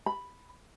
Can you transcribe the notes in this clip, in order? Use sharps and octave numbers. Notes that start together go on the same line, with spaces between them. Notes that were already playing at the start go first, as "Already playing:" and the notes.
B5